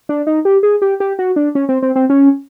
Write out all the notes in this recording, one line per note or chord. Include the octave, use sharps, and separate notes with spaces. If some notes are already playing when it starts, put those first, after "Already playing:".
D4
D#4
G4
G#4
G4
G4
F#4
D4
C#4
C4
C4
C4
C#4